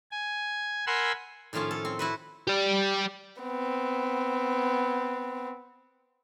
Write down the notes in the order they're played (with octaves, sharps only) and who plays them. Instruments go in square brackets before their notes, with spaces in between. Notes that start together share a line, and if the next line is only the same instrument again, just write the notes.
[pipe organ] G#5
A#4 F#5 G#5 B5 C6 E6
[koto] A2 D#3 F3 C#4 F4 A5
A4
C4
E4 F#4 B4
[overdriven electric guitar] G4 D5
[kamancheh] B3 C4